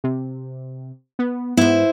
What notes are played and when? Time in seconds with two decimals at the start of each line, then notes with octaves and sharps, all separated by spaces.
0.04 C3
1.19 B3
1.57 G#2 B3 E4 C5